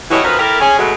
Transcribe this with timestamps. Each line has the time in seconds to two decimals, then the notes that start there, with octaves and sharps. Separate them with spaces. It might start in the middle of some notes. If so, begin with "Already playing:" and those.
0.10 E3 A3 C#4 F#4 G4 D#5
0.24 F#2 D#3 F3 A#4 B4
0.38 E4 G4 A4 A#4
0.60 C#4 G#4
0.78 B2 F#3 G#3 A3